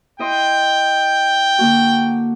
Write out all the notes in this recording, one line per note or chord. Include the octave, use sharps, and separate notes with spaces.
E4 D#5 G5 C6
D3 A#3 F#4